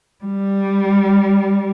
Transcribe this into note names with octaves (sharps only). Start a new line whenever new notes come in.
G3